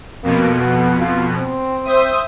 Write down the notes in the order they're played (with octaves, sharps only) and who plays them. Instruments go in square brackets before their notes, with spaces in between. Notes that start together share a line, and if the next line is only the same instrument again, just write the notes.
[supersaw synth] F2 B2 [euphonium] A#3
[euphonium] B3
F4
C4
[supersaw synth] C5 E5 D#6